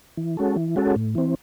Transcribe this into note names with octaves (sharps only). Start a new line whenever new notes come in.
E3
G#3 C#4 F#4 A4
E3
G#3 C#4 F#4 A4
A2
E3 C4